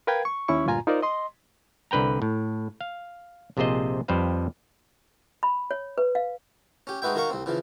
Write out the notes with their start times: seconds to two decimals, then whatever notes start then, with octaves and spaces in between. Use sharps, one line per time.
0.07 A#4 B4 F5 G5 G#6
0.25 C#6
0.48 D#2 C#4 E4 C#6
0.66 D2 G2 A#2 F4 G#5 A#5
0.87 D#4 F4 A#4 C5 D5
1.02 D#5 C6
1.91 C2 D3 B4 G5 A#5
2.22 A2
2.81 F5
3.57 A#1 C3 F4 G#4 C5 D#5
4.08 F2 G3 B4 C5 F5
5.43 B5
5.71 C#5
5.98 B4
6.15 F5
6.87 C#4 G4
7.02 G#3 D#4 F#4 B4 E5 G5
7.15 D#3 F#4 A#4 F5 A#5 C#6
7.30 C2 C4
7.46 C#3 E3 F3